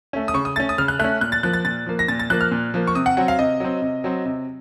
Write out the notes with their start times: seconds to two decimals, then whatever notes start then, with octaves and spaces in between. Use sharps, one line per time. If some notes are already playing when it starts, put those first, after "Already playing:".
0.13 A3 C#4
0.28 D#6
0.34 C#3 C#6
0.45 D#6
0.56 A3 A6
0.60 C#4
0.69 D#6
0.78 C#3 F6
0.88 F#6
0.99 A3 F#6
1.04 C#4
1.21 A#2 F#6
1.32 A6
1.43 F3 A#3 F#6
1.53 A6
1.65 A#2 A6
1.86 F3 A#3
1.99 A#6
2.08 A#2 A6
2.19 A6
2.30 F3 A#3 F#6
2.41 F6
2.51 A#2
2.74 F3 A#3
2.87 C#6
2.95 C3 D#6
3.06 F#5
3.17 F#3 C4 F#5
3.28 F5
3.39 C3 D#5
3.60 F#3 C4
3.82 C3
4.04 F#3 C4
4.25 C3